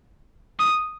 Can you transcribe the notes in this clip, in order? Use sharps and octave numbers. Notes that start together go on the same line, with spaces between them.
D#6